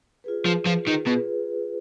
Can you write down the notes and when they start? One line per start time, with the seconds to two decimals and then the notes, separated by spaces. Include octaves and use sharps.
0.24 F4 G#4 B4
0.45 F3
0.65 F3
0.87 D#3
1.06 B2 F4 G#4 B4